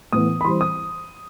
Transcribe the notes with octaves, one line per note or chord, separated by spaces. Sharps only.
A2 E3 B3 D#6
B5
E3 G3 C4 C6
D#6